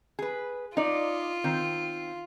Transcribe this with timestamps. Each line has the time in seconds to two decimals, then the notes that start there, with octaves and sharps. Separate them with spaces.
0.19 G#4 B4
0.77 D#4 F4 D5
1.44 D#3 C4